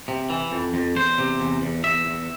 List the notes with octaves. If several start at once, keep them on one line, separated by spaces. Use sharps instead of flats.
C3
E3
F2
F2
E2 C5
C3
E2
E2
E2 E5
E2